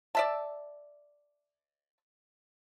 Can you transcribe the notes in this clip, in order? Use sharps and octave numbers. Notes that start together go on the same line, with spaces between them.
D5 E5 A5